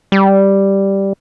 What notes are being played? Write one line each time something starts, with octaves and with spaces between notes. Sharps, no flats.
G3